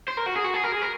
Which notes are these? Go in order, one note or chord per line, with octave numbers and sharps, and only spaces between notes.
C5
A#4
F#4
G#4
F#4
G#4
A#4
G#4
A#4